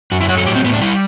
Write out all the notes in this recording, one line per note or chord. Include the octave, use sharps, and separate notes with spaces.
F#2 F#4
E4
F#3 F#4
A4
A2 G4
C4
A2 B3
D4
G3 E4